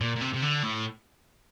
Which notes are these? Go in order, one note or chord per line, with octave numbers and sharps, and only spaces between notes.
A#2
A#2
C3
C3
D3
A2